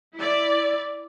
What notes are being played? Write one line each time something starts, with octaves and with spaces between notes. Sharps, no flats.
E4 D5